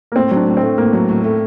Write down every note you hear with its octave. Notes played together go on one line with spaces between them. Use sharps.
A#3
A2 C4
F#3 D4
A2
C4
A3
A2 A#3
F#3
A2
A3